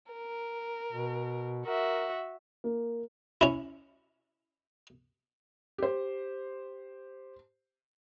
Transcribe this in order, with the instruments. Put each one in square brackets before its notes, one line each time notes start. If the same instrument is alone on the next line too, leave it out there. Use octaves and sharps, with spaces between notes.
[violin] A#4
[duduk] B2
[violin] F#4 E5 [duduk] A#4
[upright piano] A#3
[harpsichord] C#4 E4
[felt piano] G4 C5